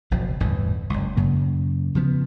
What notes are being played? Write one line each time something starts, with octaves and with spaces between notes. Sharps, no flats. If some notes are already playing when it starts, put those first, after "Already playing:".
F#1 C#2 B2 F3
G1 E2 A2 E3
F#1 C#2
F#2 C#3 A#3
C#3 F3 B3